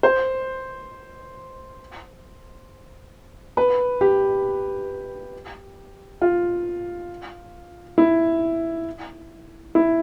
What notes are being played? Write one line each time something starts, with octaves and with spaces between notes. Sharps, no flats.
C5
B4
G4
F4
E4
E4